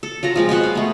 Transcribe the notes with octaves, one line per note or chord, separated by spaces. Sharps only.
A4
F#3 F4 A#5
F3 G#3 C4
B2 C5 F#5 C#6
F5
A3 B3